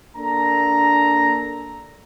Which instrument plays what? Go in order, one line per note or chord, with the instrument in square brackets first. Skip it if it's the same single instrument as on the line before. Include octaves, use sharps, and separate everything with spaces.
[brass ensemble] A#3 D4 A4 A#5